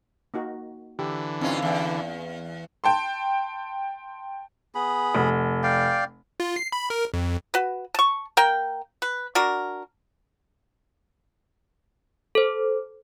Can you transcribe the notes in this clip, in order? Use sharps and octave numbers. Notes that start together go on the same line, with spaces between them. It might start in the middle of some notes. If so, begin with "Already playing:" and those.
A#3 D#4 F#4
D3 E3 G4
G2 C4 C#4 D#4 F4
E2
G5 A5 C6
B3 G#4 B5
F1
D5 F5 G5
F4
C7
B5
A#4
F2
F#4 B4
A5 C#6
A#3 A#4 G5
B4
D4 F#4 A#4
A4 C5